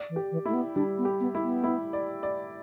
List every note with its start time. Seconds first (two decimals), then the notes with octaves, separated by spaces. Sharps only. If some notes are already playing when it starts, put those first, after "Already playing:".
Already playing: D5
0.09 E3
0.16 G4
0.31 E3
0.46 A3 E4
0.54 B3
0.75 G3 D4
0.98 B3
1.05 G4
1.20 B3
1.35 E4
1.42 B3
1.64 E4
1.93 D5
2.23 D5